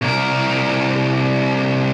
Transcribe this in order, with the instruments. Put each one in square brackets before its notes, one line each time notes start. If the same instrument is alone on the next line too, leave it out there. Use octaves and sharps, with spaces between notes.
[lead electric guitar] C2 A#4